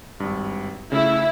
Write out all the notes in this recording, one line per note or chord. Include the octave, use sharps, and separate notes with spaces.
G#1 G2
C#3 A3 E4